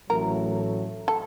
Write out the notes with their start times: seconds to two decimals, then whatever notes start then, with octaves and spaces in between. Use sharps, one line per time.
0.10 A1 A2 F#3 A3 A#4
1.08 A4